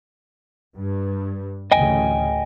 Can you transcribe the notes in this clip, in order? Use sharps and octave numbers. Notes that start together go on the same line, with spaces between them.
G2
A1 D2 C#3 D#5 G5 G#5